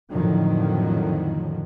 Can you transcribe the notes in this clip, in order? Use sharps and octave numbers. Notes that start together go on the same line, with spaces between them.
F2 A2 D3 D#3 F3 F#3